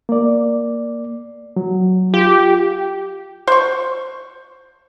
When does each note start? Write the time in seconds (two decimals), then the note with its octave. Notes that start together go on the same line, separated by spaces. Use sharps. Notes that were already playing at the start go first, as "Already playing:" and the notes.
0.09 A#3 D5
1.56 F#3
2.14 F4 G4
3.47 C5 C#6